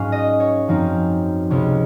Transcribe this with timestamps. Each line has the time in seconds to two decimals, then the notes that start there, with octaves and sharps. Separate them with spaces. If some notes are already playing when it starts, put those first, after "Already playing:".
Already playing: G#2 F#3 C#4 F5
0.12 D#5
0.40 C#5
0.68 F#2 F3 C4 D#4
1.50 C#2 C3 F3 G#3 C#4 C#5